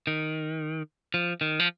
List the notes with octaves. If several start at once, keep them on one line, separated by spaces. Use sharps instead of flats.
D#3
F3
D#3
F3